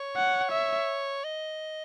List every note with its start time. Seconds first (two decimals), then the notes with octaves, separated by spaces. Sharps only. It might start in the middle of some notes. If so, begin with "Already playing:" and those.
Already playing: C#5
0.16 F#5
0.52 E5
1.24 D#5